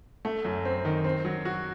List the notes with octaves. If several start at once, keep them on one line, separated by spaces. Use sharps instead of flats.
A3
F#2
C4
D#3
C4
F#3
F#4